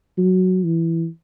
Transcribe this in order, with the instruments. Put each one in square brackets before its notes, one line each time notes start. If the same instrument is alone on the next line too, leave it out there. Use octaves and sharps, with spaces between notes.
[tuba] F#3
E3